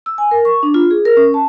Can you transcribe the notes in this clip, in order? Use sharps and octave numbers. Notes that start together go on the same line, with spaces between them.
E6
G#5
A#4
C#6
D4
F4
G#4
A#4
C#4
A5